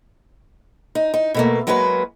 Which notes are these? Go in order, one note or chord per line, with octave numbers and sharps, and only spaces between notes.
D#4
D#4
B2 A3 A#3
F#3 G#3 A#3 F#4 B4